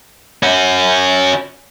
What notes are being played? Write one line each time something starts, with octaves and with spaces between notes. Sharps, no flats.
C#4 F#4